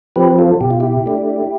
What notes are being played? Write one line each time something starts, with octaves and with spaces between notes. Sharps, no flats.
F3 C4 G4 B4
F4 A4
B2 G4
F4
E4 G4
A3 D4